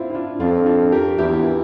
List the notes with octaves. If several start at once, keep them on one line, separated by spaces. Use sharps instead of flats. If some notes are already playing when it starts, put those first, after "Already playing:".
Already playing: C4 D4 E4 F4
E4
D4 F4
F2 D4 F4
D4 F4
G4 A#4
E2 E4 G4